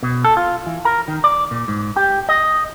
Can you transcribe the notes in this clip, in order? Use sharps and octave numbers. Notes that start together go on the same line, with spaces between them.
B2
A4
F4
E3
A#4
D#3
D5
A#2
G#2
G4
D#5